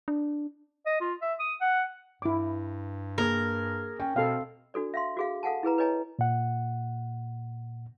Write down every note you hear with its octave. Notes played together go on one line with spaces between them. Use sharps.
D4
D#5
F4
E5
D#6
F#5
G2 E4 D6
A#3 G#4 A#4
C#4 G5
B2 C4 A4 F5
D4 F#4 A4 D5
E5 F5 C6
F#4 G#4 F5
A4 F5 F#5 G#5 A5
E4 G#4 B4 A#5
B4 C#5 D#5 G#5 A#5
A#2 F#5